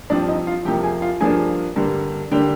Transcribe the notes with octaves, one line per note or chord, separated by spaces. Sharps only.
G2 F3 C4 D4 D5
D#4 D#5
F4 F5
F2 C3 F3 A#3 G4 G5
G#4 G#5
F4 F5
G2 F3 A#3 D4 G#4 G#5
G2 D3 G3 A#3
D3 G3 A#3 D4 G4 G5